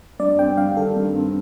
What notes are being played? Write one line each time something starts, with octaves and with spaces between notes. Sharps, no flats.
G2 D5
C4 G5
G3 F5
D#3 A4
G2
C4